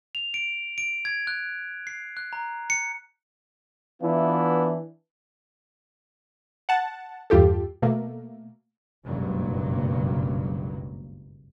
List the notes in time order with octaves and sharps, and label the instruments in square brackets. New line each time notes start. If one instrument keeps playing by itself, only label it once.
[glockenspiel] F7
D7
D7
G#6
F#6
C7
F#6
A#5
C#7
[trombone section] E3 B3 D4 E4 F4
[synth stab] F#5 A5
E2 G2 F4 G4 A4
B2 A3 A#3
[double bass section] F#1 C#2 G2 B2 F#3 A#3